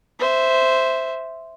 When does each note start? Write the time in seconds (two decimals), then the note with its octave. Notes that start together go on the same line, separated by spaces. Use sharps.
0.19 C5 E5